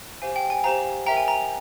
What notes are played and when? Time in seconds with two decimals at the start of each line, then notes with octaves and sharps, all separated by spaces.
0.22 G4 C5 F5 G#5
0.36 G5
0.50 G#5
0.64 G4 C5 F5 A#5
1.06 A#4 E5 G5 A#5
1.17 G#5
1.28 A#5